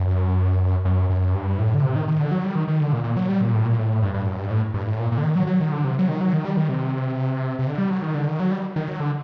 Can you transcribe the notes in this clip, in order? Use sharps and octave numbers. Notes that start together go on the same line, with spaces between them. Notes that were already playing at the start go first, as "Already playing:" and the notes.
Already playing: F#2
F#2
F#2
G2
A2
D3
C3
D#3
D#3
D3
F#3
G3
D#3
D#3
D3
A#2
A#2
F#3
G3
A#2
A2
A#2
A2
G2
G2
F#2
G2
A2
G2
A2
A#2
A#2
D3
D#3
F#3
F#3
D#3
D3
C3
F#3
D#3
F#3
D#3
G3
D#3
C3
C3
D3
G3
F#3
D#3
D3
D#3
F#3
G3
D#3
F#3
D3